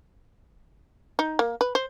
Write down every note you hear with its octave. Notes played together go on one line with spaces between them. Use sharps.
D#4
A#3
B4
C5